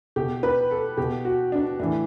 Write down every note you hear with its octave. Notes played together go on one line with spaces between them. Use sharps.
B2 G4
B4
A4
B2 G4
F#4
D4
A2 E3 D4